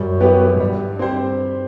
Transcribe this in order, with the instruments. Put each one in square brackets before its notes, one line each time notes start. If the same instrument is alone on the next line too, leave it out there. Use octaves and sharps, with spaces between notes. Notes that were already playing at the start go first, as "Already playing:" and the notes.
Already playing: [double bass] F#2 [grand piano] G3
[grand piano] B3 E4 G4 B4
[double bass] G2 [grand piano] G3
[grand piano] C4 G4 C5